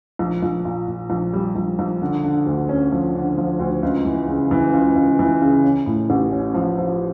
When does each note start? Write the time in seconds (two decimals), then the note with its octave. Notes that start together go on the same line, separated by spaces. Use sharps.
0.19 A#1
0.43 A#1
0.65 A#2
0.87 A#2
1.10 A#1
1.33 G3
1.56 A#1
1.79 A#1
2.02 D3
2.24 D3
2.46 D2
2.69 C#4
2.92 F3
3.15 D3
3.38 F3
3.59 D2
3.83 C#2
4.05 E3
4.28 C#3
4.51 E3
4.73 C#2
4.96 C#2
5.19 E3
5.42 C#3
5.64 C#4
5.86 A2
6.10 A1
6.32 C#4
6.54 F3
6.78 F3